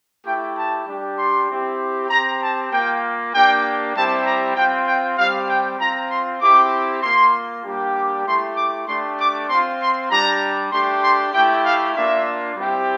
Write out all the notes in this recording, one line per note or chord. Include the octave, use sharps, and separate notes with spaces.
A3 E4 G4 G5
A5
G3 D4 G4
C6
C4 E4 G4
C4 G4 A#5
A5
A#3 F4 G5
A#3 D4 G4 G5
G3 C4 E4 G4 A5
A#5
C4 F4 G5
G5
G3 C4 G4 F5
G5
C4 F4 A#5
C6
C4 E4 G4 D6
A#3 F4 C6
G3 A#3 D4 G4
D6
A3 E4 G4 C6
D6
A3 D4 G4 C6
D6
C4 F4 C6
C6
G3 D4 G4 A#5
A3 D4 G4 C6
C6
A3 E4 G4 G5
F5
A#3 D4 F4 E5
G3 C4 E4 G4